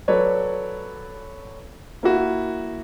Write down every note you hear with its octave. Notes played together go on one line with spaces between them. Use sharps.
F#3 A4 B4 C#5 D5
A#3 E4 F#4